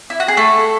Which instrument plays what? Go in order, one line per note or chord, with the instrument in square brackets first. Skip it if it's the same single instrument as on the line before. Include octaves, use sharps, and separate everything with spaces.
[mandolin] E4
F#4
G#4
A3 A4